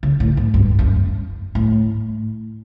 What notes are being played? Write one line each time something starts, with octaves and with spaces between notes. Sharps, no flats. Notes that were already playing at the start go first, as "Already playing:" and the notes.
C#3
A2
A2
G2
F#2
A2